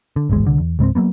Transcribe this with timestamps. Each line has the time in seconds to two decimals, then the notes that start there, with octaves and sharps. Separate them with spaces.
0.16 D3
0.29 D1 G#1 E2 G#3
0.45 C2 D3
0.59 E2
0.79 C#2 G#2 B3 C4
0.95 F#3 G3 A#3 B3